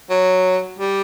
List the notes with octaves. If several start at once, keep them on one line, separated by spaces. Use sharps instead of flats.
F#3
G3